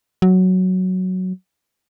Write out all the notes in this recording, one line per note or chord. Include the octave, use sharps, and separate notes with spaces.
F#3